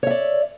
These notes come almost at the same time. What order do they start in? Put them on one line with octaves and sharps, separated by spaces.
C#5 E5 D5